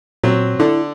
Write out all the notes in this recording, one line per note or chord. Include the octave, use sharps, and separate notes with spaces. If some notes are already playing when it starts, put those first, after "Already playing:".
A#2 F#3 C4
D3 D4 E4